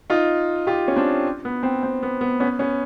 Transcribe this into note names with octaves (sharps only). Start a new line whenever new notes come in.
D#4 F4
F4 G4
C#4
C4 D4
B3
C4
C4
B3
B3
B3 C#4
B3 C#4